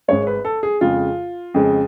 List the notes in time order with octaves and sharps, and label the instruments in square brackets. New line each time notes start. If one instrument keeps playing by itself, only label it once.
[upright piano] G#1 G#2 G#3 C#5
B4
A4
G#4
F2 C#3 G#3 F4
F2 C#3 G#3